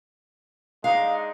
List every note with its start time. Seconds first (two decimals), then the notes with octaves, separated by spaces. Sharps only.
0.84 G#3 D4 D#4 F5